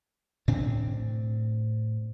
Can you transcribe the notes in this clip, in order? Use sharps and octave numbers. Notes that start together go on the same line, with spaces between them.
A2 C4 D4